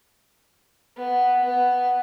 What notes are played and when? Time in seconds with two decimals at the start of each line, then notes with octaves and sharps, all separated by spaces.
0.97 B3
1.44 B3